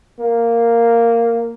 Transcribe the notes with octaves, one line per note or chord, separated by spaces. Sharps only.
A#3